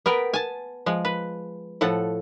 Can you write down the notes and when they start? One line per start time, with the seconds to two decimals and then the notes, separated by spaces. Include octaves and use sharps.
0.06 B3 A#4 B4 G5
0.33 G#5 A5
0.86 F3 G#3
1.05 B4
1.81 A2 F3 A4 F#5